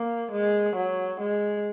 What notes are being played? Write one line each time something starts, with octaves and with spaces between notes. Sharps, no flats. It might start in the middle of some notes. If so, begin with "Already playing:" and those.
Already playing: A#3
G#3
F#3
G#3